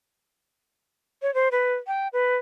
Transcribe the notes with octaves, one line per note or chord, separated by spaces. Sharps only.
C#5
C5
B4
G5
B4